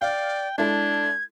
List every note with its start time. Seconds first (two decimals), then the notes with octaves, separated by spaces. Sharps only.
0.02 D5 F5 G5
0.58 G#3 D4 E4 A4 G#6